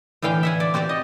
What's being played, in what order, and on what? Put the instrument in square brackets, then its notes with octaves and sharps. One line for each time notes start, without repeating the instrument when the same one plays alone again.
[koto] A2 D3 E3 F5 G5
E5 F#5 G#5
D5
C4 F#4 G4 D5
D#5